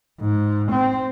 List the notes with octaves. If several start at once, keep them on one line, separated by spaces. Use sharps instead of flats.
G#2
C4